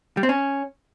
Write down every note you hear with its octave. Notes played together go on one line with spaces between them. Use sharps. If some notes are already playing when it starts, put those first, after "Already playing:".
G3
C4
C#4